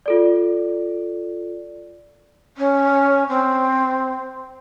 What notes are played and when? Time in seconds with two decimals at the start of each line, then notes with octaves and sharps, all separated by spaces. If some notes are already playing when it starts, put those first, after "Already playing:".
0.06 F4 A4 D5
2.57 C#4
3.29 C4